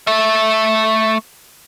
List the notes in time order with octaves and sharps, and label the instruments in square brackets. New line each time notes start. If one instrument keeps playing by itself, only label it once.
[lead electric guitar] A3 E5